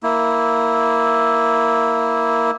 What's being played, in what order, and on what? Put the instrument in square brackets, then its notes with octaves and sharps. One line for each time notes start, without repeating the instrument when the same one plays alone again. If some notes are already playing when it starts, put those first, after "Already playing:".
[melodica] A#3 E4